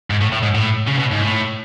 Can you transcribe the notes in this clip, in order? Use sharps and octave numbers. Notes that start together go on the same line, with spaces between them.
G#2
A2
A2
G#2
A2
C#3
B2
G#2
A2